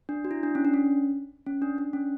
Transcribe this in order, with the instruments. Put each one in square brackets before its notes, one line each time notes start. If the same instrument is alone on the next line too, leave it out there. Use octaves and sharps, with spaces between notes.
[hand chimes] D4
F#4
E4
D4
C#4
D4
C#4
C#4
D4
D4
C#4